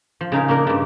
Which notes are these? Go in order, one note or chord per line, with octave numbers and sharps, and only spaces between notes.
F3
C#3 D#4 G#4 A#4
A#3 C#4 D4 A#4
G2 C#3